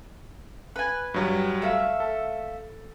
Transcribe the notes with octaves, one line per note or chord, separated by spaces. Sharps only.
B4 G#5
G2 F#3 G3
A3 E5 F5
A4